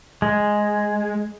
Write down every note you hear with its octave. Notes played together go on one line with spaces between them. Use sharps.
G#3